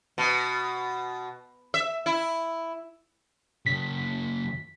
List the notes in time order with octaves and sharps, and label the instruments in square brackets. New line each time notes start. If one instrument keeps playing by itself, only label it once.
[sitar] B2
E5
E4
[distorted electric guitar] F#2 C#3 [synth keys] B6